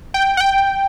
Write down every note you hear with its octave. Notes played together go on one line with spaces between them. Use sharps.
G5
F#5
G5